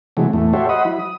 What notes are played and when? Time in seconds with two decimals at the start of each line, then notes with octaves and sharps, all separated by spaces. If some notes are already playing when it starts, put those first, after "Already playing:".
0.17 C3 E3 F#3 G#3 A3
0.33 E2 A2 A3
0.53 F#4 G4 A4 C5 C#5 E5
0.69 C5 D#5 F#5 B5 D#6
0.85 F#3 E4 B5
0.99 D#6